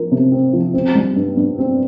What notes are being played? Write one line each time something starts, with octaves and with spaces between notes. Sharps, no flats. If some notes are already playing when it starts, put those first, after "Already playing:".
Already playing: F3 A#4
C3
C4
F3
C4
G3
G2
G2
C4